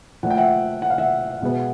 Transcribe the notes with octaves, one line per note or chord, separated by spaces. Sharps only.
A#2 F3 A3 F#5
G5
E5 F#5
F#5
F5
E5 F#5
B2 G#3 B3